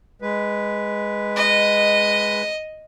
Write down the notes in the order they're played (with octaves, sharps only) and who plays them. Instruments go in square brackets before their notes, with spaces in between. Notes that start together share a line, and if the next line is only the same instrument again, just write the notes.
[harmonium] G#3 B4
[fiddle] D#5